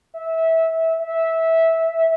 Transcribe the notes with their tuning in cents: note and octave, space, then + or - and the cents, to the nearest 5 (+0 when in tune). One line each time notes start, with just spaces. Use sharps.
E5 -20
E5 -15